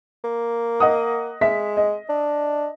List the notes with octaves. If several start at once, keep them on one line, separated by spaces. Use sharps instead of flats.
A#3
D#5 F#5 D#6
G#3 E5 B6
D#5
D4